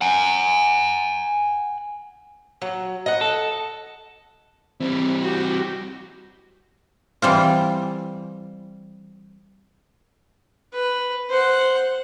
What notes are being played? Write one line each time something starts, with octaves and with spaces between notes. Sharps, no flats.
F#5 G#5
F#3
D#5 F#5
A4
E3 G3 C4
F#4 G4
E3 G3 C4 F4
B4
C5 F#5